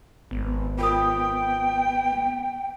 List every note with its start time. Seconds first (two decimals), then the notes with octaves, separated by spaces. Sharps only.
0.31 G#1 B3
0.78 F4 A#4 G5 D#6